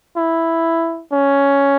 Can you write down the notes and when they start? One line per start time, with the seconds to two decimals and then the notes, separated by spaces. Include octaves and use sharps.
0.17 E4
1.13 C#4